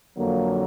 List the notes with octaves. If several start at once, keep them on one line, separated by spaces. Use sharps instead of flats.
F2 D3 F#3 A#3